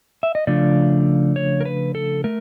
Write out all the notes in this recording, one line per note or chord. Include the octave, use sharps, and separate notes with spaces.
E5
D#5
C#3 F3 A3 D4 F4 D5
C#5
A#4
B4
A4
A3 A#4